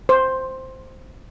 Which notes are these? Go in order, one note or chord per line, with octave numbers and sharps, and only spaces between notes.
C5